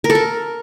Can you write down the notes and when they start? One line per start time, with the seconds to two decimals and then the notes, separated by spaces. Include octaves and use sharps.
0.04 A#4
0.10 A4
0.15 A#4